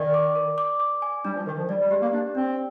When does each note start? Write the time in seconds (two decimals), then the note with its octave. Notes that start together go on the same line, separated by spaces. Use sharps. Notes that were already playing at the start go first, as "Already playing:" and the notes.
Already playing: D#3 D5 G#5
0.14 D6
0.35 A#4
0.58 D6
0.80 D6
1.02 G#5
1.25 G3 D4
1.36 F3
1.46 D#3 D4
1.57 F3
1.69 G3 D5
1.80 G3
1.91 G#3 G4
2.02 A#3
2.13 D4 G4
2.35 C4 D4